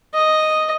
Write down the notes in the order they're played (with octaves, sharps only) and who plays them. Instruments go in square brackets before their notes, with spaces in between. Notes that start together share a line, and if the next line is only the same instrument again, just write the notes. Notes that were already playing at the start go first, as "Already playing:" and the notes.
[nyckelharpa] D#5